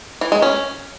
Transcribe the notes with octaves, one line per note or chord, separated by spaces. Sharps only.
E3
G#3
C#4